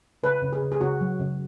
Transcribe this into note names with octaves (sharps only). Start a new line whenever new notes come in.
C#3 B4
C#3
G#4
C#3
G#4
C#3 F#4
F#3
C#3